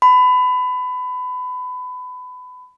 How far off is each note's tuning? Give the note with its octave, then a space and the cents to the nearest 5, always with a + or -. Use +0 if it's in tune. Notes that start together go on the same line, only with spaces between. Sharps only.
B5 +25